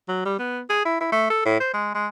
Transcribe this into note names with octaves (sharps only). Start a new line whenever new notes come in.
F#3
G3
B3
G#4
E4
E4
A3
A4
A2
C5
G#3
G#3